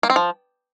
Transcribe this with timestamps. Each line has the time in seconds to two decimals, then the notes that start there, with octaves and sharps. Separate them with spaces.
0.03 A#3
0.10 C4
0.16 F3